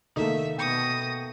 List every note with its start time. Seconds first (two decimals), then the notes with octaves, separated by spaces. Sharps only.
0.16 C3 D#3 A3 A#3 D#4 A4 E5
0.58 B2 G5 D#6 G6 A#6 C#7